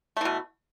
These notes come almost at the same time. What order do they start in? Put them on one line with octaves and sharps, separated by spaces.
A3 E3 B2